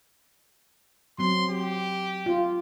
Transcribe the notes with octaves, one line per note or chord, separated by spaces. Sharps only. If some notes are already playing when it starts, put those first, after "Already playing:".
F#3 C4 C6
G4
F4